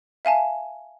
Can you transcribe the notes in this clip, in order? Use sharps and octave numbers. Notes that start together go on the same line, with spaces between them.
E5 F5 G#5 A5